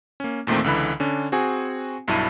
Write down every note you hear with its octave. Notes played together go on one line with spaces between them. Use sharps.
A#3 C#4
E2 A#2 D#3 A3 C4
C#2 D3 E3 B5
D3 C#4 D4
C4 F#4 G#4 G#5
B1 G2 F#3 E4 A5 D#7